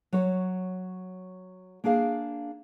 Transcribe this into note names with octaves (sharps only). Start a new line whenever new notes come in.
F#3 C#5
A#3 D4 G#4 F5